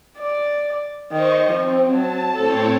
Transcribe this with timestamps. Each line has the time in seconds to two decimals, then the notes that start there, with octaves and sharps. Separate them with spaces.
0.18 D5
1.12 D#3 C5 D#5 C#6
1.50 F3 C4
1.89 F#3 A5
2.36 A2 C4 A4 C#5